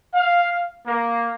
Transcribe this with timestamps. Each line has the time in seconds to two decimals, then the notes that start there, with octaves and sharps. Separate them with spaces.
0.13 F5
0.85 A#3